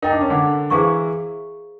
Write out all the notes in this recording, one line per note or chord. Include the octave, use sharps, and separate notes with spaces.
D#4 A#4 D#5 G5 A#5
D4
C#4
D3 D4
E3 E4 G#4 C5 F5 A#5 C#6